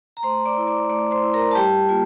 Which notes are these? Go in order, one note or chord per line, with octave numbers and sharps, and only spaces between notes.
A#5
A3 C5 C6
D5 D6
E4
D5 D6
A3 D5 D6
C5 C6
E4
A#4 A#5
A5
G3 G4 G5
A#3 F4